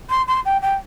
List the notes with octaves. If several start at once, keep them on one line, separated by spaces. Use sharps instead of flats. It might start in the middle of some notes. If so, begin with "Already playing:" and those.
C6
C6
G5
G5